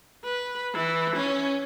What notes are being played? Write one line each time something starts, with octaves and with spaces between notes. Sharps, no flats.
B4
E3
C#4